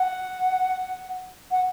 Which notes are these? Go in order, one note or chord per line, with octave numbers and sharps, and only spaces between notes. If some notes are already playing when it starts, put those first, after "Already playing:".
Already playing: F#5
F#5